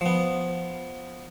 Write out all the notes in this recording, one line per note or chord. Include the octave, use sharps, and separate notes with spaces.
F3 B3